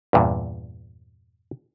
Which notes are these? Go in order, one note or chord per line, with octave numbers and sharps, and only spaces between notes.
E2 G2 A#2